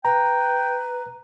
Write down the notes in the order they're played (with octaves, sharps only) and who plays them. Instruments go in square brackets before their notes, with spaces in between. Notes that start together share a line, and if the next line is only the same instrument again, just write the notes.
[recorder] B4 [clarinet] G5 [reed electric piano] A#5